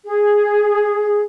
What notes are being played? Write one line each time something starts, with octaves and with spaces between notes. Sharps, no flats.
G#4